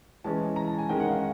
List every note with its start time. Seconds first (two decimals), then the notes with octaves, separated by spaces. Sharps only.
0.24 E3 G#3 C#4 A5
0.56 A#5
0.68 A5
0.79 G#5
0.89 D#3 G#3 C#4 G5
1.00 F#5
1.10 F5